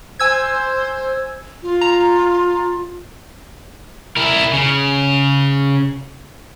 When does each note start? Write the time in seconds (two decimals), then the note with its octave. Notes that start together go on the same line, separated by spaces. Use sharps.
0.20 C5 G#5 E6 G#6
1.63 F4
1.81 A#5
4.17 E4 A#4
4.53 C#3